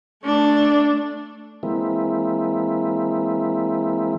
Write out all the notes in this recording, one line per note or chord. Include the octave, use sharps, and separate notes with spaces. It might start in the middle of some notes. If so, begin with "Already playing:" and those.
A3 D4
E3 G#3 A#3 C4 E4